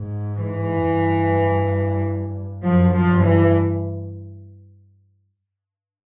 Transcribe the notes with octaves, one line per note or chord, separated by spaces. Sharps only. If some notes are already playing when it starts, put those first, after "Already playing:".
Already playing: G#2
E3
G2
F#2 F3
F3
G2
E3